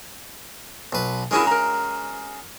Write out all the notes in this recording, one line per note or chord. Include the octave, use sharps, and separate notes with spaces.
B1 B4
G#3 C#4 E4 F#4 G#4 A#4
A#4 A#5